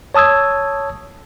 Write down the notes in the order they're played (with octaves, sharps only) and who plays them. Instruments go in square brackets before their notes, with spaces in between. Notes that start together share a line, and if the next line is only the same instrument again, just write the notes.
[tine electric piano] C#5 A5 D#6 E6 G#6